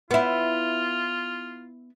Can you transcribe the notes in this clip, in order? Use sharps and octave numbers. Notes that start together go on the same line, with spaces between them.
B3 E4 F4